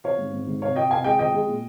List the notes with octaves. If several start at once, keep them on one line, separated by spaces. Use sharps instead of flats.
F3 C#5 F5
G#2
G#2
G#2
C3 C#5 F5
F3 D#5 G5
C3 F5 G#5
G#3 D#5 G5
F3 D#5 G5
G#3
A#2